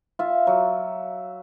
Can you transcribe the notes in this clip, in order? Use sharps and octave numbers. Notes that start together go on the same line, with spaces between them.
F4 E5
F#3